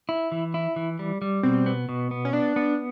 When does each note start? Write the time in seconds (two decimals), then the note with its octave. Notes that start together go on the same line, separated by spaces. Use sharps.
0.09 E4
0.32 E3
0.54 E4
0.76 E3
0.99 G3
1.22 G3
1.43 B2 C4
1.66 B3
1.89 B2
2.11 B3
2.25 C#4
2.33 B3 D4
2.56 B3